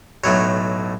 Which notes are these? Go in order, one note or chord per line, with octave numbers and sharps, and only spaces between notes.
B1 A2 F#3 A3 C#5